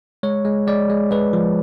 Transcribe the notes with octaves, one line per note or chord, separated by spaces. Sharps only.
G#3 C#5
G#3
G#3 D5
G#3
G#3 B4
F3